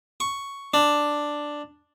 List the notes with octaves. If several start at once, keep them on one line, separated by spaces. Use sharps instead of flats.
C#6
D4